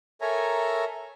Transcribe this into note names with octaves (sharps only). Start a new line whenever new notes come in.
A4 A#4 C#5 E5 G#5 A#5